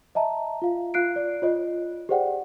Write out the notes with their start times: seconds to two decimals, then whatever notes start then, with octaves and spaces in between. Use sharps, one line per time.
0.15 D#5 E5 A5 A#5
0.62 F4 F5
0.94 F4 F5 F#6 C7 D7
1.16 D5
1.42 F4 C#5 D#5
2.09 G4 G#4 C5 D5 F#5 G5